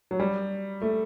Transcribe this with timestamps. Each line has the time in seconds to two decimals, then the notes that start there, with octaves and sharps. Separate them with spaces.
0.11 F#3
0.20 G3
0.82 A3